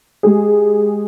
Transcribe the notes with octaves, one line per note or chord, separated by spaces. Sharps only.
G#3 G4 G#4